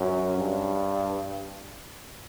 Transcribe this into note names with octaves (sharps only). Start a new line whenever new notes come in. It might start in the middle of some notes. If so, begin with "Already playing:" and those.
Already playing: F#2
G2